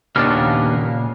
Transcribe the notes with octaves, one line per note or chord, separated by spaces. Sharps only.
D#2 A#2 C#3 A#3 B3 D4 A5 F6